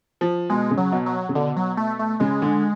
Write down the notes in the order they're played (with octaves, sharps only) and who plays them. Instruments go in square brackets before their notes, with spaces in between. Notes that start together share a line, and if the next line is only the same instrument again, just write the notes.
[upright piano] F3
[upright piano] B2 [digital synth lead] G#3
[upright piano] C#3
[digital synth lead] F#3
[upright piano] B2
[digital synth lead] F#3
[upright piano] C#3
[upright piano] B2 [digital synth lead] D3
[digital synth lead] F#3
A3
A3
[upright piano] C#3 [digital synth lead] G#3
[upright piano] D3